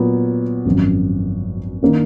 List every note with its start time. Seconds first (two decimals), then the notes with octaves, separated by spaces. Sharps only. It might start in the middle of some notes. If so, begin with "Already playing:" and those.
Already playing: A#2 F#3 B3
0.65 G#1 F#2 F3
1.83 D#3 A#3 D4